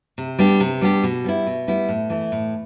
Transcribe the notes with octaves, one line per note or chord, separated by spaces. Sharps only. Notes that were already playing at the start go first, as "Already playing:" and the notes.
C3
G3 B3 D4 G4
C3
G3 B3 D4 G4
B2
G3 B3 E4
B2
G3 B3 E4
A2
E3 A3 E4
A2